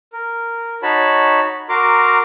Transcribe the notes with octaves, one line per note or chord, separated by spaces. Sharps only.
A#4
D#4 F#4 C#5 A5 B5
F#4 A#4 A#5 C6 D6